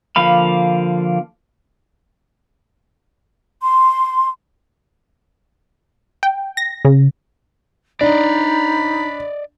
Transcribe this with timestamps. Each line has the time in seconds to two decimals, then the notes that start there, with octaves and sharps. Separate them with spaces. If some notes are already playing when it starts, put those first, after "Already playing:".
0.16 D3 F3 A#3 F5 B5
3.60 C6
6.23 G5
6.57 A#6
6.85 C#3
8.01 D4 D#4 D5 D#5 B5